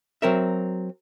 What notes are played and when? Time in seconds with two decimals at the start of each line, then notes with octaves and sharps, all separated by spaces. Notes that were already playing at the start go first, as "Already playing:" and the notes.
0.22 F#3 C4 A#4 E5